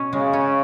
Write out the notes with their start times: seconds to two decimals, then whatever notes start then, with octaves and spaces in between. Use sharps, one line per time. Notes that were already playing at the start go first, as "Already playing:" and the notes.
Already playing: B2 C#4
0.13 C#3 G#3
0.33 C#4